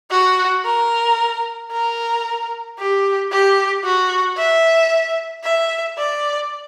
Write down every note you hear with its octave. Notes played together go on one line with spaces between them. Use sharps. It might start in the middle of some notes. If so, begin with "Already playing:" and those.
F#4
A#4
A#4
G4
G4
F#4
E5
E5
D5